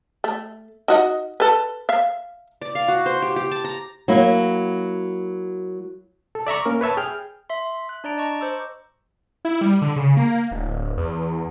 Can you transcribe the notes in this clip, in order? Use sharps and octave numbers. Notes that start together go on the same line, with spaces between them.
A3
D#4 F#4 D#5
A4 B4
E5 F5
D5
F5
F#4
C5
G4
G4
A5
A#5
F#3 A#3 E4
A4
D5 E5 A#5 C#6
A#3 C#4 A#4
B4 C#5 E5 A5
G#4 G5 F6
E5 C6
F#6
D4 D5 A#5 D7
D#5 A5 A#5 C#6
C5 D6 E6
E4
G3
D3
C#3
A#3
D1
E2